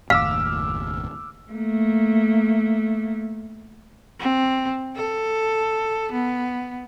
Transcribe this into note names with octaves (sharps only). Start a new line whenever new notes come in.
F#1 D#2 A2 F5 D6 E6 F6
A3 A#3
C4
A4
B3